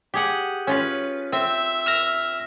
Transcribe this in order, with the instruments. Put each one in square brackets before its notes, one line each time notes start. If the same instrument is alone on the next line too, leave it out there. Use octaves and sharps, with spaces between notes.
[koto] G4 G#4 F#5
C#4 F4 B4
[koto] C4 [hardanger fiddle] E5
[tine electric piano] E6 F6 A#6